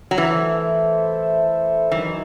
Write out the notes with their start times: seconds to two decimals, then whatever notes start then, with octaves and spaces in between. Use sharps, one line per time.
0.11 F#3
0.17 E3 A3 E4 A4 C5 E5
1.91 F#2 D#3 E3 F#3